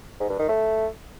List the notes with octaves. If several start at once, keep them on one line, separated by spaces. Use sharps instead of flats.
G#2
G2
D#3
A3